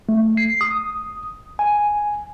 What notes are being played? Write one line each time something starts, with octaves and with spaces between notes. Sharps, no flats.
A3
C7
D#6
G#5